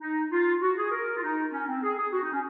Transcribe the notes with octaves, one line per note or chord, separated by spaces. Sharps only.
D#4
F4
F#4
G#4
A#4
F4
D#4
C#4
C4
G#4
G#4
F#4
D#4
C#4